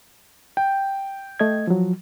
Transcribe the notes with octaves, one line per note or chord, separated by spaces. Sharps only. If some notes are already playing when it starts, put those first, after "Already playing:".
G5
A3 D#5 G#6
F3 F#3